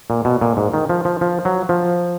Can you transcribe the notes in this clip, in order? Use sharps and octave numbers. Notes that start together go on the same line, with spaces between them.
A#2
B2
A#2
G#2
D#3
F3
F3
F3
F#3
F3